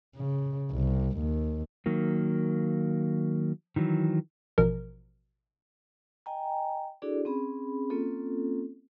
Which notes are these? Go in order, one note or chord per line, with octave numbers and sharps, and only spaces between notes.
C#3
C2
D#2
D#3 F#3 A#3
D#3 E3 F#3
A1 B2 F3 A#4
D#5 G5 G#5 A#5
D4 E4 F#4 G#4 A4 D5
C4 C#4 G#4 B5
A#3 C4 C#4 F4 A4